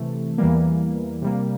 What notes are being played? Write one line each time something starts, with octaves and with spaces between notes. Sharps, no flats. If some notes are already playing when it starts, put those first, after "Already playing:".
Already playing: C3 E3 A3
E2 E3 G3 A#3
C3 G3 A#3